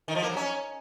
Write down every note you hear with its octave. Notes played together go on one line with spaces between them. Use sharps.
D#3
F3
A#3
F#3
C#4